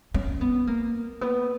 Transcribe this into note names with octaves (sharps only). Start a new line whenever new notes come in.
C#4
B3
A#3
B3